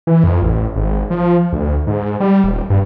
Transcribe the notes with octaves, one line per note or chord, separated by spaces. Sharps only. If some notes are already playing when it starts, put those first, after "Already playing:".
E3
F2
A1
G#1
F3
D2
G#2
G3
D#1
G2